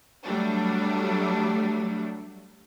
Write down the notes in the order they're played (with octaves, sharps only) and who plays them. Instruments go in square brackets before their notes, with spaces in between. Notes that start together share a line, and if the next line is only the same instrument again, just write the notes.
[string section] F#3 G3 A3 D4